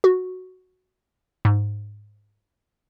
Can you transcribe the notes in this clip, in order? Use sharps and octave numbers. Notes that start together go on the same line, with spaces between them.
F#4
G#2